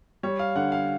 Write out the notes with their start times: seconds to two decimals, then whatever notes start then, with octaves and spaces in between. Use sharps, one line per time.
0.23 G3 C#5
0.39 F5
0.56 D3 F#5
0.72 F5